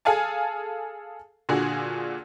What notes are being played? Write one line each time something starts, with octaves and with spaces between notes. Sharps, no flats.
G#4 A4 F5 G#5 A5
A#2 D3 F#4 G#4